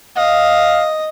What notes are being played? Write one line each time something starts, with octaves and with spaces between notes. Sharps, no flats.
D#5 F5